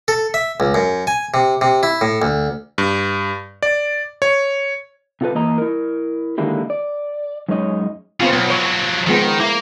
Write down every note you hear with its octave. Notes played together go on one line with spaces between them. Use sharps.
A4
E5
C#2
F#2
G#5
C3
C3
E4
A2
D2
G2
D5
C#5
C3 F4 A4 B4
E3 A#3 D#5 A#5
E4 A#4
D3 D#3 G#3 A#3 E4 G4
D5
F#2 G#3 C#4 D#4 C#5 D#5
C#3 B3 C4 F4
B1 B3
F3 F#3 C#5
D#3 F3 G#3 B3
A#3 E4